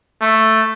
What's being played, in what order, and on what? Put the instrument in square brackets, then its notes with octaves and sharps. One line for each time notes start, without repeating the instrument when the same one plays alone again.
[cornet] A3